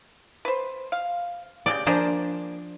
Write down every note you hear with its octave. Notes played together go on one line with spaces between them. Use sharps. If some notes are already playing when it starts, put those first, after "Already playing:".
B4 C5
F5
C#3 F3 G4 D5
F3 A#3 D4 G#4 C5